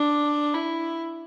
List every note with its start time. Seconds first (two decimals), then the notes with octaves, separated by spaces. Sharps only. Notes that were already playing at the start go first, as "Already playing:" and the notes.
Already playing: D4
0.54 E4